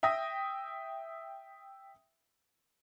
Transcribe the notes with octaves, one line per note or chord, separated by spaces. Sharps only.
E5 G5 D#6 A#6